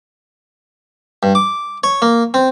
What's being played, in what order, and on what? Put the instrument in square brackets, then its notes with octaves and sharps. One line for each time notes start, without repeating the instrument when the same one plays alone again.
[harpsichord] G2
D6
C#5
A#3
C4